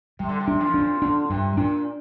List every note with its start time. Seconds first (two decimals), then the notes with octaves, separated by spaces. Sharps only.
0.19 C3 G3
0.29 D3
0.40 C3
0.48 D4
0.60 F2 F3
0.74 D4
1.02 D3 D4
1.30 G2 C3
1.57 A#2 D4